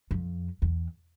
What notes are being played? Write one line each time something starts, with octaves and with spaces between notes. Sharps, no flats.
F2
E2